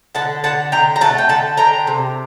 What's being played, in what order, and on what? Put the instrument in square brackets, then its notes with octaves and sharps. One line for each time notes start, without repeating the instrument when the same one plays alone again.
[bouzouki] D3 F#5 A5
D3 F#5 A5
D3 G5 A#5
A#5
A3 F#5 A5
G5
D3 F#5 A5
D3 G5 A#5
C3